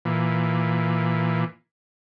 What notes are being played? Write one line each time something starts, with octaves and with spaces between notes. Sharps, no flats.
A#2 E3